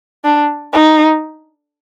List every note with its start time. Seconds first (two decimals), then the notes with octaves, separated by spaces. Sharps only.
0.24 D4
0.73 D#4